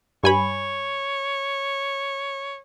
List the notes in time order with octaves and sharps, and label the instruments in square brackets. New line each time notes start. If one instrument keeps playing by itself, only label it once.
[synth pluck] G2 G#5 B5 [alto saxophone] C#5